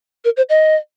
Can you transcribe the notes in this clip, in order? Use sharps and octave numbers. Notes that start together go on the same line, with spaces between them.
A#4
C5
D#5